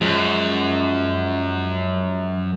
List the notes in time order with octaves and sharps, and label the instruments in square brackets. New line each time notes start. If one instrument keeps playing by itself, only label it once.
[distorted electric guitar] F#2 [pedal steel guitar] F3 G#3